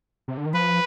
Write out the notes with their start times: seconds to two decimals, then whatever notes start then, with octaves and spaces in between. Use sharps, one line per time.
0.28 C3
0.37 D3
0.46 D#3
0.54 F3 B4